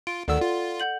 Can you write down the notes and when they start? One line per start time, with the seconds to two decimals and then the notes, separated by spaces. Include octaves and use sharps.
0.07 F4 D7
0.28 D2 D#3 A4 D5 F#5 E6
0.41 F4
0.80 F#5 G6 F#7